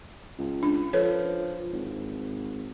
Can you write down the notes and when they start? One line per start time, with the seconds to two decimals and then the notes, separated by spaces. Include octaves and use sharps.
0.39 C#2
0.63 D4
0.93 F3 A4 B4 C#5
1.72 G#1